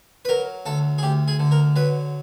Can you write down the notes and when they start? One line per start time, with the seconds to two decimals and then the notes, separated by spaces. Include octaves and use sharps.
0.25 B4
0.29 F#3 A#4
0.66 D2 A4
0.98 G#4
1.03 D2 G4
1.28 G#4
1.39 D3
1.52 A#4
1.76 F#3 B4